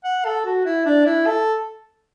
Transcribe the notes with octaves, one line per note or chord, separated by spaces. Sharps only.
F#5
A4
F#4
E4
D4
E4
A4